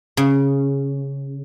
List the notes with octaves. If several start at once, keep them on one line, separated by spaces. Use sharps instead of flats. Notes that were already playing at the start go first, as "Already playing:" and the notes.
C#3